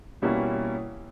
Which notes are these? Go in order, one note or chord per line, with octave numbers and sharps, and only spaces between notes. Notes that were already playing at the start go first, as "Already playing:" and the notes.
B2 G3 A#3 C#4 E4